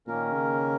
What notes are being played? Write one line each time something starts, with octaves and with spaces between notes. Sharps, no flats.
A#2 D#3 A#3 C#4 A#4
C#3